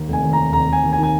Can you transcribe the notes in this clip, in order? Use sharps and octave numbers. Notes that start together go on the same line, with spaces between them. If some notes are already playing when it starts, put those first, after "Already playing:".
Already playing: D#2
F1 G#5
D#2
A#5
D#2
F1 A#5
F1 G#5
D#2
G#5
D#3
G#5